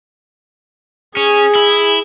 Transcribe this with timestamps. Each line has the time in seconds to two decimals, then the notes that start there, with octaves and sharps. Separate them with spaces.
1.17 C#4 G#4
1.55 E4